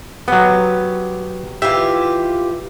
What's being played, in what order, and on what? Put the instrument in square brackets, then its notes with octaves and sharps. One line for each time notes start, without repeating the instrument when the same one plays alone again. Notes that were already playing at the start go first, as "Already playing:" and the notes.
[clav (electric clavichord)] F#3 B3 [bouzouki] G4
[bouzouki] E3 F4 G4 [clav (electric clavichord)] E5